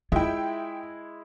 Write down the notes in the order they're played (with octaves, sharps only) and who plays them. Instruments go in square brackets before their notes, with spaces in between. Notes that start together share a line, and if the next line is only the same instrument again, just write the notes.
[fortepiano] G#3 E4 [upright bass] F4 [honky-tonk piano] E5 G5